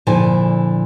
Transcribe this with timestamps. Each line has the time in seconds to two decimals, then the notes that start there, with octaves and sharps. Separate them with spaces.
0.07 A#2 D3 F3 E4 G#5 A5